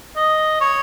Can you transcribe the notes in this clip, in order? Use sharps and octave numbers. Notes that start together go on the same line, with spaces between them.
D#5
C#5